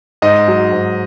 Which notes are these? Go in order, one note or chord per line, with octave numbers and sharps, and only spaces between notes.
G#2 D#5
F#3
G#2